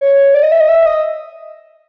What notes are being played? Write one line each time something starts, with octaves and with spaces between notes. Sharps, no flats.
C#5
D5
D#5
E5
D#5
E5
D#5